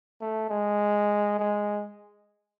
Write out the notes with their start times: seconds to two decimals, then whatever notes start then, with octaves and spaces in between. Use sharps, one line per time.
0.21 A3
0.50 G#3
1.39 G#3